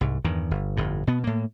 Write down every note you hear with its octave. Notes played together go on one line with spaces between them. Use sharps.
C2 G#2
E2 G2 D#3
G1
G1 F2 A2
B2 B3
A2 A#3